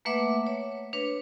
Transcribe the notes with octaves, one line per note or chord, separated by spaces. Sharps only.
A3 A#3 B4 E5 F#5 D6
C#5
D4 B4 C#5